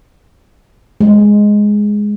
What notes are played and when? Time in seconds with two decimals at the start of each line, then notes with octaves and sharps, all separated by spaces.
1.01 G#3